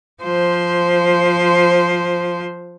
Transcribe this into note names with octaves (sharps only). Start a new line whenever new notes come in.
F3 C5